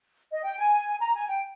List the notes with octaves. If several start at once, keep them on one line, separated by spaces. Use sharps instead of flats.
D#5
G5
G#5
A#5
G#5
G5